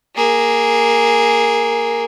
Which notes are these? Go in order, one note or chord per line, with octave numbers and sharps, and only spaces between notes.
A#3 G#4